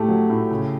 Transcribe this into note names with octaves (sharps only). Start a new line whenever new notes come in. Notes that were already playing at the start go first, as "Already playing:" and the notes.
Already playing: A2 A3 G4 A4
F#3
A2
C#3